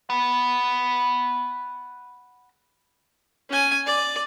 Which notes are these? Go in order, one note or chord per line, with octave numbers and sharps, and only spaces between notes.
F#5 B5
C#4 G#5
D5